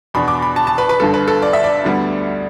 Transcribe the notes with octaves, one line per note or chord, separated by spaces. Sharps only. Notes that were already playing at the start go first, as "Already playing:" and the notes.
E2 B2 B3 D4 B5
D6
B5
A5
A5
B4
B4
G1 G2 D3 A4
B4
A4
D5
E5
D5
D2 D3 G3 B3